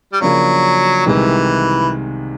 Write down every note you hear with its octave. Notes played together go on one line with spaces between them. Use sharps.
G3
C#3 F3 F#3 A#3 D4
C2 C3 D#3 E3 G#3